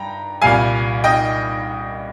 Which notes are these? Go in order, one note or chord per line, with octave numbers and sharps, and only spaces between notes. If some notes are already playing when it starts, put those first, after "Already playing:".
Already playing: G2 G5 A#5
C2 A#2 G3 F5 G#5
D#5 G5